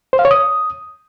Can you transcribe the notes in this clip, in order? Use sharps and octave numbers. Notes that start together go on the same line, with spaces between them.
C5
F5
C#5
D#6